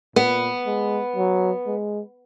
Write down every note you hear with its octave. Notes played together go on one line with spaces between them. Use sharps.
A#2 B3
G#3
F#3
G#3